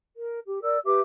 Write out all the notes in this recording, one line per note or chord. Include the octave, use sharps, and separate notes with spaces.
A#4
G4
A#4 D5 E6
G4 B4 E5 D6